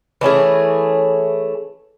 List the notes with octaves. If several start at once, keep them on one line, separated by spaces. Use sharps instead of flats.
E3 A3 C#4 G#4